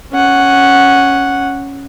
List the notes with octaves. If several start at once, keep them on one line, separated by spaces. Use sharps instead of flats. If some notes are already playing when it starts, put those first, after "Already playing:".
C#4 F#5